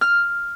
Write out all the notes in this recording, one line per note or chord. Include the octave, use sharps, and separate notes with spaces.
F6